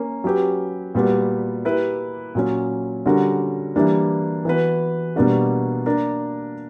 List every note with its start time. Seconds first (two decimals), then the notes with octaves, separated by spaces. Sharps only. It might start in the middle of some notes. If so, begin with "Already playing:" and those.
Already playing: A#3 C#4
0.24 F#3 C#4 G4 B4
0.95 A#2 G3 B3 F#4
1.65 A#3 E4 G4 B4
2.35 A#2 F#3 C#4
3.06 D3 G3 C#4 F#4 A#4
3.76 E3 G3 A#3 D4
4.45 E3 B3 F#4 B4
5.16 B2 G3 A#3 D4 F#4
5.86 A#3 D4 A#4